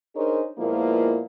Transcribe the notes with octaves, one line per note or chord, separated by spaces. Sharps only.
D4 D#4 G#4 A#4 C5 C#5
A#2 F3 G#3 A#3 B3 E4